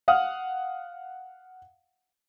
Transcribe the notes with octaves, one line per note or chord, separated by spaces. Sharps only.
F5 F#5 D#6 F6